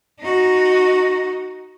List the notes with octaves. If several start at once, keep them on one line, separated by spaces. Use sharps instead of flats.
D#4 F#4